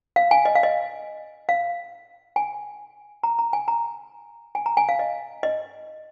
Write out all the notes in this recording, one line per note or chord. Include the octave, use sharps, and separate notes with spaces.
F5
G#5
D#5
F5
D#5
F5
G#5
A#5
A#5
G#5
A#5
G#5
A#5
G#5
F5
D#5
D#5